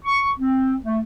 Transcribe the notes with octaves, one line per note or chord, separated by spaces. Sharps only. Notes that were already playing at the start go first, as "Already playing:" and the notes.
C#6
C4
A3